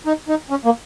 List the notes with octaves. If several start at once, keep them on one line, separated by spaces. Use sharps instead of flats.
D#4
D#4
C#4
A#3